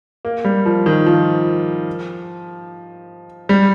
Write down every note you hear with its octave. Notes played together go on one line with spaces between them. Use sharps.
A#3
G3
F3
D#3
F3
G3